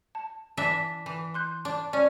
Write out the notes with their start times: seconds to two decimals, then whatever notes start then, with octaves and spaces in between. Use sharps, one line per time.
0.15 A5
0.57 E3 D4 E5
1.06 E3
1.34 C6 F#6 G6
1.65 D4
1.93 C#4 D5